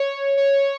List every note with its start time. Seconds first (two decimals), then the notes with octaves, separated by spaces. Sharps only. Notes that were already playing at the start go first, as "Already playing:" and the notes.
Already playing: C#5
0.37 C#5